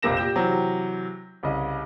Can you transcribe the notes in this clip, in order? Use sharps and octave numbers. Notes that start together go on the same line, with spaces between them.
F1 A#1 C3 A#3 A#6 E7
A#2 G4 G5 G6 E7
C3 E3 F#3
C2 C#3 D#5